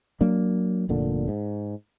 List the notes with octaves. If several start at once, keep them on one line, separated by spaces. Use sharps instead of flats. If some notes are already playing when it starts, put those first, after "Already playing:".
F#3 A#3 D4
F1 A#2 D3
G#2